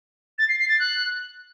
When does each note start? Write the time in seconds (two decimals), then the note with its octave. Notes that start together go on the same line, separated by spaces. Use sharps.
0.39 A6
0.49 C7
0.59 C7
0.69 A6
0.80 F#6